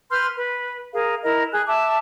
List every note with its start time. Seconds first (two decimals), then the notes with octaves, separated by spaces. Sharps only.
0.11 B4 C6 F6 G6
0.35 B4
0.93 G#4 A#4 F5
1.23 E4 A#4 D#5
1.52 G#4 F#6
1.67 E5 A5 D6